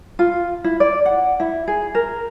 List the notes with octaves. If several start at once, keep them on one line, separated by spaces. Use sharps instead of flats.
F4
E4
D5
F#5
E4
G#4
A#4